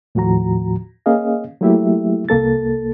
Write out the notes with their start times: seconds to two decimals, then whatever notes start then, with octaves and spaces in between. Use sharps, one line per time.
0.15 D#2 A2 F3 F#4 A#5
1.06 A#3 C#4 G#4 D#5 F5
1.61 F#3 A3 A#3 E4 G4 E5
2.29 C2 A#3 A4 A6